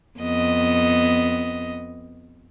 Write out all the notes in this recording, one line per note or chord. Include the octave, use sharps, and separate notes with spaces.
F2 B3 D#5